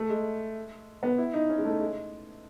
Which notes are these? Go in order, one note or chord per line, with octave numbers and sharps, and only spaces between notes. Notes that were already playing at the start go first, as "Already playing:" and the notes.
Already playing: A3
G#3
B3
E4
D#4
C#4
G#3
A3
G#3